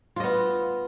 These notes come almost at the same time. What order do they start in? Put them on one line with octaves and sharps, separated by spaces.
F4 D#5 B3